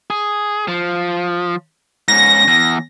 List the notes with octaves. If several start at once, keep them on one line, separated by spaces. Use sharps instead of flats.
G#4
F3
G#2 C#4 A#6
E2